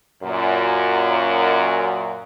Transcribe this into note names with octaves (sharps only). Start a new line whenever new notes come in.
F#2 A#2